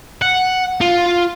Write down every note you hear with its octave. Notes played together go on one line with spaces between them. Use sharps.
F#5
F4